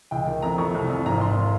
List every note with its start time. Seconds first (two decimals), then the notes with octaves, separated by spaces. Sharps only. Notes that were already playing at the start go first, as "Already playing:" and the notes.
0.11 C#2 G5
0.27 D#3
0.42 F2 A#5
0.58 F2 C#6
0.75 C2
0.90 C2
1.06 G#1 A#5
1.21 G#1 C6